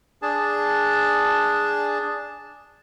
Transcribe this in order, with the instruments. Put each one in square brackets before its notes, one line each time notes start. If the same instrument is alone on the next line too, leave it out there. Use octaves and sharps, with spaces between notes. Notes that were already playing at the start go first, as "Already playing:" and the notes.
[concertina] D4 G#4 A5